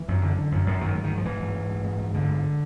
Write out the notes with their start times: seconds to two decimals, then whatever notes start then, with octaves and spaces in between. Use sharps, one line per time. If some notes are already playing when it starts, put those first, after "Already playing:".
Already playing: E3
0.08 F#2
0.22 D3
0.38 D3
0.52 F#2
0.66 F#2
0.81 G#2 D#3
0.95 G#2
1.04 D#3
1.10 G#2
1.17 F3
1.25 G#2 E3
1.40 G#2
1.54 G#2
1.69 G#2
1.84 G#2
1.99 G#2
2.14 G#2 D3
2.29 G#2